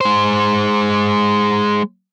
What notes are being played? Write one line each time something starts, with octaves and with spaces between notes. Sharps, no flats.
G#3 C5